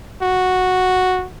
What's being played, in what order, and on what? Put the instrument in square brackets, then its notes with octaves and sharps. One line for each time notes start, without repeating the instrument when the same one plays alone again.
[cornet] F#4